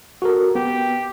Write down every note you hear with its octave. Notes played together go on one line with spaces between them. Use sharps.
F#4 A4 A#4
B3 G4